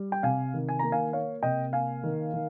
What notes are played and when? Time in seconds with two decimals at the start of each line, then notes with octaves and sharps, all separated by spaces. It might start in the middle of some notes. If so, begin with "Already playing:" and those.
Already playing: G3
0.12 G5
0.23 C3 F5 G#5
0.54 D#3
0.69 G#5
0.79 A#3 A#5
0.92 F5 G#5
1.13 A#3 C#5 F5
1.43 C3 D#5 G5
1.73 A#3 F5 G#5
2.04 D#3
2.33 D#3